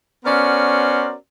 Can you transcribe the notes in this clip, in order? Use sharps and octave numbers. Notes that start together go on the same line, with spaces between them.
B3 C#4 F#4 A#4 C5 D5